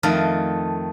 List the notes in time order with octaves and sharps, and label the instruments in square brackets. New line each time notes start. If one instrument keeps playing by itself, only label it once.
[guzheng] F2 D#3 A3 F5